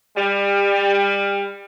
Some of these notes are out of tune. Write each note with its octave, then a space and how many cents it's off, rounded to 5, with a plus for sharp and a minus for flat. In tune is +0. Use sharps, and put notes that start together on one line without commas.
G3 +30